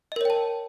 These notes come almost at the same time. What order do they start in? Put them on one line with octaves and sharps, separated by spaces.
D#5 A#4 C#5 G5 A5